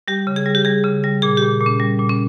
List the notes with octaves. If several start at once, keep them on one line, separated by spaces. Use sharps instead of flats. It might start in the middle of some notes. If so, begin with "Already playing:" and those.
G3 G4
C#3
G#4
G3
G4
G3 G#4
C#3
G3
A#2 G#4
A#2 G4
A#2
C#4
G3
A#2
C#4